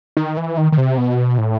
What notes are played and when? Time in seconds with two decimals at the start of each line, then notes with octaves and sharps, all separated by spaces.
0.17 D#3
0.37 E3
0.57 D#3
0.72 D#3
0.78 C3
0.98 B2
1.38 A2